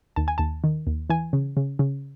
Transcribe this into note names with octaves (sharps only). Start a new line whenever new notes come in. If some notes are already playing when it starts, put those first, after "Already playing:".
D#2 A5
G#5
D#2 A5
D#3
D#2
E3 G#5
C#3
C#3
C#3